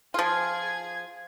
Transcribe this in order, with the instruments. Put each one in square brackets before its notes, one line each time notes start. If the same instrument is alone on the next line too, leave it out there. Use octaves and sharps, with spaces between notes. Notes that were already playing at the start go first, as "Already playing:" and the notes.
[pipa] F3 F4 [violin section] G#4 G#6